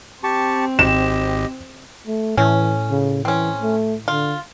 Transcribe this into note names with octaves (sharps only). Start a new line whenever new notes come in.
C4 G4 A5 C#6
G#1 G4 D#5 E7
A3
A2 E3 C#4
C#3
E3 C4 C#4
A3
D3 F4